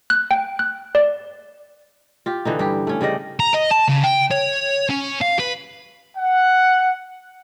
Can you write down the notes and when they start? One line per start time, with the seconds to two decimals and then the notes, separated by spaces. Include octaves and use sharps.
0.10 F#6
0.31 G5
0.59 F#6
0.95 D5
2.26 F4 G4
2.45 D3 E3 D#4
2.59 G2 G4
2.87 A3 C#4
3.01 C#3 G3 D5 D#5
3.40 A#5
3.54 D#5
3.71 A5
3.88 C#3
4.03 G5
4.31 C#5
4.89 C#4
5.21 F5
5.39 B4
6.17 F#5